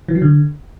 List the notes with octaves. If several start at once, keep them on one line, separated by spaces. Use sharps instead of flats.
E3
F#3
D3